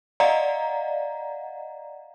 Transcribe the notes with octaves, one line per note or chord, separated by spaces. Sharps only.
D5 D#5 F5 F#5 A#5